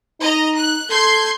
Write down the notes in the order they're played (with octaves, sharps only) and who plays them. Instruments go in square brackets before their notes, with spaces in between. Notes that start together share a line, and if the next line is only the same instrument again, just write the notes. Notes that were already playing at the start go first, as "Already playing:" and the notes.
[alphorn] D#4 [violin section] D#5 A#5
[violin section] F#6
[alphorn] A4 [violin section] C6 G6 G#6